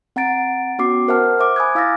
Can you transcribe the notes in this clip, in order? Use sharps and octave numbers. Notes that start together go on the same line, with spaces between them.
C4 F#5 A#5 A6 D7
B3 C#4 F#4 D6 C7
A#4 C5 E5 F#5 A5 F6
C5 E5 D6
G#5 B5 D6 D#6 F#6 G#6
E4 F5 E6 F6 A6 A#6